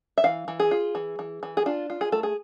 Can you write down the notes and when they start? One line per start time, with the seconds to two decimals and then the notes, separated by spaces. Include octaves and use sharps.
0.18 E5
0.24 E3 F5
0.48 E3
0.60 G#4
0.71 F4
0.95 E3
1.19 E3
1.43 E3
1.57 G#4
1.66 D4 F4
1.90 F4
2.01 G#4
2.12 A3 A4
2.23 G#4